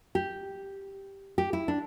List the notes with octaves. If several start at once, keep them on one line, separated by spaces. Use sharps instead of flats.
G4
G4
E4
D4